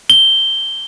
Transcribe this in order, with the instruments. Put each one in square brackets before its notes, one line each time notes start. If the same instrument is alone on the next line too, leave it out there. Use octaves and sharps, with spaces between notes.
[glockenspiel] G7